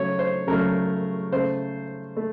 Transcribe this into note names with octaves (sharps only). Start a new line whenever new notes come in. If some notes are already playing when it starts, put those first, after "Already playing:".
Already playing: C#3 F#3 A3 C#5
C5
C#3 F#3 A3 A#4
C#3 A3 C5
A3